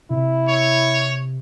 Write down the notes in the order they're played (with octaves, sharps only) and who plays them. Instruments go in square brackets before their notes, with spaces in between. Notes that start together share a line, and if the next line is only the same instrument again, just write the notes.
[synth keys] C3 [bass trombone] E4
[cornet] C#5